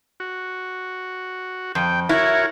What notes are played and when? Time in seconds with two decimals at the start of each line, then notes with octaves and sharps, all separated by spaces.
0.20 F#4
1.75 F2 G5
2.09 E4 F#4 A#4 C#5